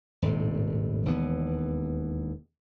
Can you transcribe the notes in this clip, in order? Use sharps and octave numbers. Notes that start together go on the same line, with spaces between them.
D#1 G#1 A2 C3
E1 D#2 E3 B3